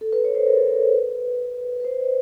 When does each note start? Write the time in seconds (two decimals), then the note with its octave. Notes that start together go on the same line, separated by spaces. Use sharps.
0.01 A4
0.13 B4
0.24 C#5
0.35 C5
0.47 A#4
0.58 A4
0.68 A#4
0.92 B4
1.80 B4
1.85 C5
2.00 D5